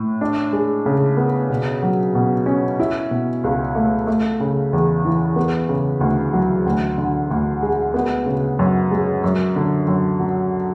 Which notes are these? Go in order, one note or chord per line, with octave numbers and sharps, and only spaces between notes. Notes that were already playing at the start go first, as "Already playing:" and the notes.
Already playing: A2
D4
G#3
C#3
B3
B2
F#3
B2
C#4
E4
B2
C#2
A3
A3
C#3
E2
E3
B3
C#3
D2
F#3
D2
D3
D2
G#3
B3
C#3
F#2
G#3
F#2
D3
F#2
F#3